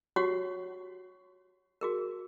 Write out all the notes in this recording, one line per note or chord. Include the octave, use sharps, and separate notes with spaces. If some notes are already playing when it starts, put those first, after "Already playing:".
F#4 G4 C#5 F#5
F#4 G#4 A#4